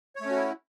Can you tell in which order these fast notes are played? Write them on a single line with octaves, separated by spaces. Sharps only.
C#5 A3 C#4 F#4 E4